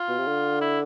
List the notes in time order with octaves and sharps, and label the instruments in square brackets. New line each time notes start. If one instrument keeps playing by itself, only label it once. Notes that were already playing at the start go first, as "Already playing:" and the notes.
Already playing: [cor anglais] F4
[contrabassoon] B2
C3
D3
[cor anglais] E4